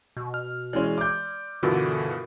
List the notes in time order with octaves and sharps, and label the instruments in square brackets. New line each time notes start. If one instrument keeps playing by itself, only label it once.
[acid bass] B2
[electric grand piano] F6
[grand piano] E3 G#3 C#4 [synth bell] D5 C6
[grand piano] D6 G6
[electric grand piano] G2 B2 E3 [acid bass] D3 [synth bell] F4 F#4 A#4